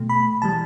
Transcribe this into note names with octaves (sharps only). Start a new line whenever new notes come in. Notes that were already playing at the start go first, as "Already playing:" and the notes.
Already playing: B2 A3
B5
E3 G3 A5